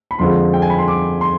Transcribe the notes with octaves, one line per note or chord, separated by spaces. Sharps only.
B5
F2 D3 F3 G#3 C6
G5
G#5
B5
C6
D6
C6